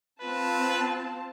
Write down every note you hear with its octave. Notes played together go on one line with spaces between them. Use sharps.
C4 F4 B4 A5